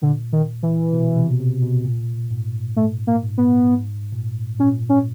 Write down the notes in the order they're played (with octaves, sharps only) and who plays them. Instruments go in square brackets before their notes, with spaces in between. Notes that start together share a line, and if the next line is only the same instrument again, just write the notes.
[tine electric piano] A#2 [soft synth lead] D3
[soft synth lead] D#3
E3
[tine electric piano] B2
C3
B2
C3
B2
A#2
G#2
[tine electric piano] G#2 [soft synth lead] A3
[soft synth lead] A#3
[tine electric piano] G#2
[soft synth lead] B3
[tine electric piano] G#2
A#2
[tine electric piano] A#2 [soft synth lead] C#4
[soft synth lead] C#4